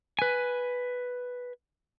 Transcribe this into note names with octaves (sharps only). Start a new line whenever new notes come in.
B4 G#5